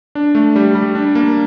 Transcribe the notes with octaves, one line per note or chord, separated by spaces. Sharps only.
D4
A3
G3
G3
D4
A#3